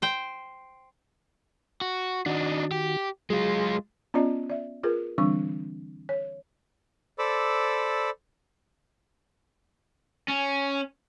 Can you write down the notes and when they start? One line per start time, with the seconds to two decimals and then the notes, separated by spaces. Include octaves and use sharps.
0.02 C5 G5
1.81 F#4
2.26 D#3 D4 D#4 F#4
2.72 G4
3.30 F#3 G#3 F4 G#4
4.14 B3 C#4 F4 D5 D#5 A5
4.50 D5 E5
4.83 F4 G#4 A#4 B4
5.18 D3 E3 G3 C4 D4 C#6
6.09 C#5
7.19 A4 C5 D5 B5 D6 E6
10.28 C#4